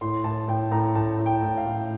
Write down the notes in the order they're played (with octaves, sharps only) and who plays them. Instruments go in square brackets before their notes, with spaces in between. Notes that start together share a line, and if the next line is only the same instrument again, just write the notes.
[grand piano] A2 C6
A2 A5
A2 G5
A2 A#5
A2 A5
A2
G5
A2
F5
A2